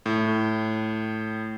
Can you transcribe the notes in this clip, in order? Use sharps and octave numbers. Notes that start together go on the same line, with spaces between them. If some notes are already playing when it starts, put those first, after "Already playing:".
A2